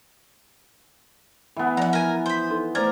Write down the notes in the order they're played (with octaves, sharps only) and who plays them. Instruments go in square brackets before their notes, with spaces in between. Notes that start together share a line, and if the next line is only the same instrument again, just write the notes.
[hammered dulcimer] E3 B3
[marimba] F3 D5 [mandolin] F#5 A#5
[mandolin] A#4 G#5
C5 B5
[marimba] D#4 A4 C6
[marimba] A3 C5 G#6 [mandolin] A#4 [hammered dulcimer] D5